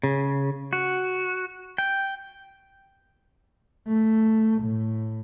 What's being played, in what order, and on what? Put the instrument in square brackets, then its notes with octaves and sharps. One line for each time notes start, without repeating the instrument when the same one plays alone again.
[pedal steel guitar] C#3
F#4
G5
[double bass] A3
A2